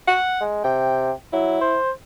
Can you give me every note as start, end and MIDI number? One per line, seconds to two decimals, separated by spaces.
0.08 0.42 78
0.41 0.61 56
0.64 1.11 48
0.64 1.11 79
1.33 1.60 54
1.33 1.76 64
1.61 1.91 72